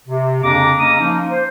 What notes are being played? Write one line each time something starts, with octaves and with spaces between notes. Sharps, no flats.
C3
F2 C#3 A#3 D4 A#5 D6
C#3 A#3 C#4 D#5 A#5 D#6
F3 A#3 C#4 D#4
C5